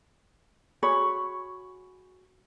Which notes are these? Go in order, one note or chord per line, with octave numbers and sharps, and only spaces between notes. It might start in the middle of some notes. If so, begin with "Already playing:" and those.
F#4 G#4 C#5 B5